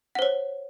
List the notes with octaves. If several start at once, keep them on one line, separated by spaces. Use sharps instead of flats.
C5 C#5 F#5